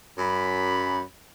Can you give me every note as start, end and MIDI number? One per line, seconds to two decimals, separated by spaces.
0.17 1.03 42
0.17 1.03 83